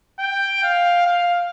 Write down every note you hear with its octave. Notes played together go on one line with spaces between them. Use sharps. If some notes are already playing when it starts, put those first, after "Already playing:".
G5
F5
F5